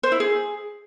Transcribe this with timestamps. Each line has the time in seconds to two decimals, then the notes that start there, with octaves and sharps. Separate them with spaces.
0.03 C5
0.12 E4
0.20 G#4